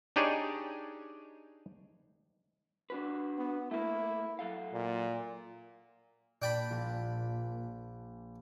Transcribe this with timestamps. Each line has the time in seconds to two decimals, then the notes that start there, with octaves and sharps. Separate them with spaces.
0.16 D4 D#4 G4 G#4 C#5 D5
2.90 D4 F#4 B4
3.38 B3
3.71 A3 A#3 E4
4.39 F#3 A4 F5
4.73 A#2
6.42 A#2 D4 G5 B5
6.71 A#1